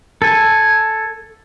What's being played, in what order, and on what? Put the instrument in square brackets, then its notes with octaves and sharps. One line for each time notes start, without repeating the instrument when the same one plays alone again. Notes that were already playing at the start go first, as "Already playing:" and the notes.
[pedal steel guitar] A4 G#5